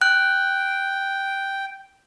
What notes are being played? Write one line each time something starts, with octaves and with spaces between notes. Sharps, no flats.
G5 F#6